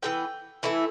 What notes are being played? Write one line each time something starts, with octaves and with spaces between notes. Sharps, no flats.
E3 G3 B3 G5
E3 A3 E4